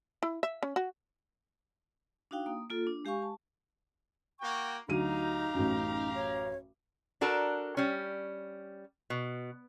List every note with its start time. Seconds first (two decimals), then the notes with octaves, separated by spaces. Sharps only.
0.23 E4
0.43 E5
0.63 C#4
0.76 F#4
2.31 D4 D#4 F#4 F5 G5
2.46 A#3 D#6
2.70 A#3 F4 A4
2.87 D4
3.05 G#3 G4 F5 G#5 C#6
3.22 A5
4.40 A#3 F#4 G5 C#6
4.88 D2 F#3 D#4 G4 F5 A#5 D#7
5.54 A1 F#2
6.15 C#5
7.21 D4 F#4 A4 A#4
7.77 G3 C#4
9.10 B2